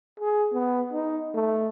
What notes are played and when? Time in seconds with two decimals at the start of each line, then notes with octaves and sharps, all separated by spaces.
0.20 G#4
0.53 B3
0.93 D#4
1.34 A3